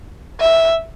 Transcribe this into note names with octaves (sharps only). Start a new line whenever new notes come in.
E5